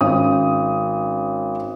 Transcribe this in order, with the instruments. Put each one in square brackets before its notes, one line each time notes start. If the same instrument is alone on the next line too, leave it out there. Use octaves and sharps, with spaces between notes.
[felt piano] G#1 C#4 D#6